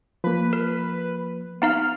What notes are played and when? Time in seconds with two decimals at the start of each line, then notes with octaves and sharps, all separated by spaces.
0.24 F3 A#3 B4
0.53 A#4
1.62 B3 D#4 F5 F6